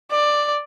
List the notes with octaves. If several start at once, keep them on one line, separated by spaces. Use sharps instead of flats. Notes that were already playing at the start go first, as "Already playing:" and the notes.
D5